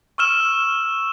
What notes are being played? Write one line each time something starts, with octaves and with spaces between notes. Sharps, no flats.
C#6 E6 F6 E7